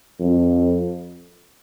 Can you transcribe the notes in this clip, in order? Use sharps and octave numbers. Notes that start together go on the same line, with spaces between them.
F2